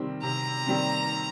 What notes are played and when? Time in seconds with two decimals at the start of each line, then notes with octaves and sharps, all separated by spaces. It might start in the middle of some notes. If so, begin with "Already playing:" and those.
Already playing: C3 D#3 G3 C4
0.23 C3 A#5
0.67 D#3 G3 C4